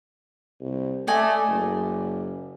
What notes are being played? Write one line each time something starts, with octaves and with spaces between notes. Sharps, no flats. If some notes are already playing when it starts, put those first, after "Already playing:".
C2
A3 D5 D#5 G#5
F#1